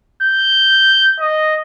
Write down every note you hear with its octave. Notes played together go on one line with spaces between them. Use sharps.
G6
D#5